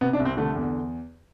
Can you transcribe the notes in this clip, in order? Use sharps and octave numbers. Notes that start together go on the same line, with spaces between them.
C3 B3
D4
C2
C4
D3 A3
E2